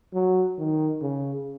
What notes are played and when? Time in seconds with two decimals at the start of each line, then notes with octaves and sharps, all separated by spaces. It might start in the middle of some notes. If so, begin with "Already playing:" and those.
0.14 F#3
0.58 D#3
1.02 C#3